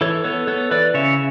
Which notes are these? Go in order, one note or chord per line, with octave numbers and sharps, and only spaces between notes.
E3 A4 C#5
B3 A4 C#5
B3 A4 C#5
E3 B4 D5
C#3 C#5 E5